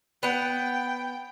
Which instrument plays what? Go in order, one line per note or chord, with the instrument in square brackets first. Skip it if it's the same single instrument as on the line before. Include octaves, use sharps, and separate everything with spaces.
[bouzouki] B3 F#5 [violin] G5